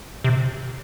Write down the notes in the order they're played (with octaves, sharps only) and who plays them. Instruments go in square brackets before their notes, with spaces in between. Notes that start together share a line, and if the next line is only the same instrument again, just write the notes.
[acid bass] C3